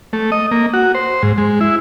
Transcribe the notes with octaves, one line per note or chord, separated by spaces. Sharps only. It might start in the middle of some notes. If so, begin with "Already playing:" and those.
A3
D#5
A#3
F#4
C5
G#2
G#3
E4